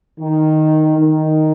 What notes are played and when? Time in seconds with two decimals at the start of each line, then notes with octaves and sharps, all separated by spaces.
0.20 D#3
0.98 D#3